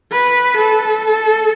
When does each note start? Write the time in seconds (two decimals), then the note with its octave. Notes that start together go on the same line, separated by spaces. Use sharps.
0.12 B4
0.57 A4